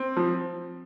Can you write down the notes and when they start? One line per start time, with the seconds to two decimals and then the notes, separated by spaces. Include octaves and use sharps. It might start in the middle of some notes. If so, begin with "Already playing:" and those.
Already playing: C4
0.17 F3